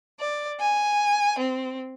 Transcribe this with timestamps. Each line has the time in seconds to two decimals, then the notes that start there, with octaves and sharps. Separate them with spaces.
0.19 D5
0.60 G#5
1.38 C4